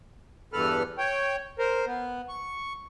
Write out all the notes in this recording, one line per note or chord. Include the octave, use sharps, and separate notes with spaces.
E2 G2 A4 B4 F6
C#5 G5
A#4 C5
B3
C#6